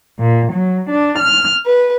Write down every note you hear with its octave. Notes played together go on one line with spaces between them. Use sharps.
A#2
F#3
D4
F6
B4